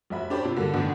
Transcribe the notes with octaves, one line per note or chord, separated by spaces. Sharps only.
F1 F#4 E5 B5
D4 G4 C5 C#5 B5
C3 F4
D3 F#3 G3 A#3
A2 D3 D#3 B3 D4